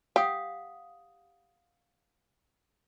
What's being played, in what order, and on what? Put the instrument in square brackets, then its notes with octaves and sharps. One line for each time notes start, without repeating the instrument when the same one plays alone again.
[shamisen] G4 [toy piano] F5 F#5 D#6